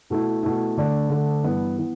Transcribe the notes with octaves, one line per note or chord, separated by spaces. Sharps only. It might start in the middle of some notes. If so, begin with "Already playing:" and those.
B2 A3 E4
B2 A3 E4
D3 A3 D4
D3 A3 D4
G2 E3 B3
E3 B3